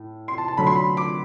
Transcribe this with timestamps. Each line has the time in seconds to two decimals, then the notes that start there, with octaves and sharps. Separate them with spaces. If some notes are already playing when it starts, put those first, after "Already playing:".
Already playing: A2
0.28 C6
0.38 A5
0.48 A5
0.57 D3 F#3 A3 B5
0.67 C6
0.75 B5
0.97 D6